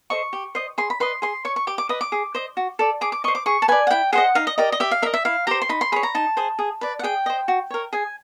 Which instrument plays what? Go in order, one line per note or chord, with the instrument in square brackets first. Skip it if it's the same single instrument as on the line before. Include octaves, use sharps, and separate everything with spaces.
[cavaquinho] A4 C5 D#5 C#6
G4
C5 D#5
G#4 C6
B5
B4 D#5 C6
G#4 C6
C#5 C#6
C#6
G4 D6
D6
B4 D#5 D#6
D6
G#4
C5 D#5
F#4
A4 D5
G#4 D6
D6
C5 D#5 C#6
D6
G#4 C#6
A5
B4 D5 G#5
F#5
E4 G5
G#4 C5 D#5 F#5
D#4 F5
D#5
G4 A#4 D5 D#5
D#5
G4 E5
F5
A#4 E5
D#5
E5
E4 F5
G4 C5 A#5
C6
D#4 B5
C6
G#4 C#5 B5
A#5
D#4 A5
G#4 C5
G#4
B4 D5
F#5
G#4 G5
C5 D#5
F#4
A#4 C#5
G#4 G#5